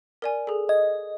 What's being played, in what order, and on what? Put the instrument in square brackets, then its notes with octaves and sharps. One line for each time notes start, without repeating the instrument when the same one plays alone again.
[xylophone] A#4 D5 G#5
G#4 A4
[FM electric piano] D#5 [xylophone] G#6